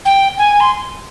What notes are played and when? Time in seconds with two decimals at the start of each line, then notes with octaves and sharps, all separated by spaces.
0.05 G5
0.38 G#5
0.60 C6